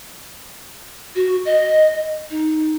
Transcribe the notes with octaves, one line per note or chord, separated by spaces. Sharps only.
F#4
D#5
D#4